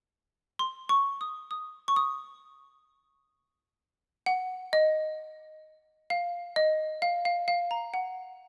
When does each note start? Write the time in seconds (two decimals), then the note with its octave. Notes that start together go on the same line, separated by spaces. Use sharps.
0.59 C6
0.89 C#6
1.21 D#6
1.51 D#6
1.88 C#6
1.96 D#6
4.26 F#5
4.73 D#5
6.10 F5
6.56 D#5
7.02 F5
7.25 F5
7.48 F5
7.71 A#5
7.94 F#5